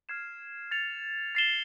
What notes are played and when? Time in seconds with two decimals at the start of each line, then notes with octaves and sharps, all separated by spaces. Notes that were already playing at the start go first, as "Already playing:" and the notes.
0.09 F6 G#6 C7 E7
0.71 A6 C#7 F7
1.35 A6 C7 E7 G7